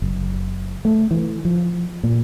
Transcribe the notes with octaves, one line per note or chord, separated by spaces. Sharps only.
F#1
A3
E3
F3
A#2